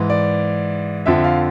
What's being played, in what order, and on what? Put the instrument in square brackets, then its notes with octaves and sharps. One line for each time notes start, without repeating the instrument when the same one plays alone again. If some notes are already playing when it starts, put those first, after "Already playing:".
Already playing: [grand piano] G#2 E3
D5
F2 D3 F3 E5
F5